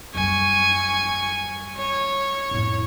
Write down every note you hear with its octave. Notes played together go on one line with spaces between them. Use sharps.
F#2 G3 G#5 C#6
C#5
F2 A2